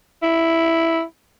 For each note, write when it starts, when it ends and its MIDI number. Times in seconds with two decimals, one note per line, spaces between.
0.23 1.02 64